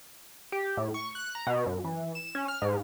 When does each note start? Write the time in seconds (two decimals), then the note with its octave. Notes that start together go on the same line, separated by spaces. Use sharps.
0.52 G4
0.77 A2
0.94 C#6
1.15 F#6
1.35 A#5
1.47 B2
1.66 F#2
1.84 E3
2.15 E7
2.35 C#4
2.48 F6
2.62 G#2